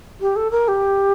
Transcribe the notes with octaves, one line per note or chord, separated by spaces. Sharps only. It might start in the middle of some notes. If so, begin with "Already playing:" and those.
G4
A4
A#4
G4